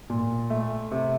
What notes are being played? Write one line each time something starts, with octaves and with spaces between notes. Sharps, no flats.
A#2
A3
C3